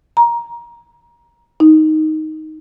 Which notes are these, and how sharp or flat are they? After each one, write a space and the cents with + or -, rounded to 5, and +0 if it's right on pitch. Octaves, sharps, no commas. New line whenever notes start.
A#5 +15
D#4 +5